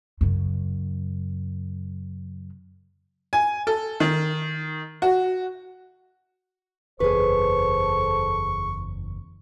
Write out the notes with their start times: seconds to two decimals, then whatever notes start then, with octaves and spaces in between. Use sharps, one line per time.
0.21 F#2 C#3
3.33 G#5
3.67 A4
4.00 D#3
5.02 F#4
7.00 F#1 E2 G#4 A4 B4 C5 C#6